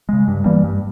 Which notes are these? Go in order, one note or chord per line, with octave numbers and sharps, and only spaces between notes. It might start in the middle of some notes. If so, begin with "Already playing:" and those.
C#3 G#3
G2
E3 G3 A#3
G2